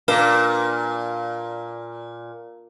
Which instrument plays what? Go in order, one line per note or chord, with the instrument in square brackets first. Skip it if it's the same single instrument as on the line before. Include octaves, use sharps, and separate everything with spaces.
[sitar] A#2 [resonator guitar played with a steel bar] A#3 D4 [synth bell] B4 F6